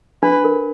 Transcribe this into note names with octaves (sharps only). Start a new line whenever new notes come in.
D4 B4
A#4